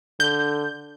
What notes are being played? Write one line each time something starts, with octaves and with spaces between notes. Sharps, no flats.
D3 G6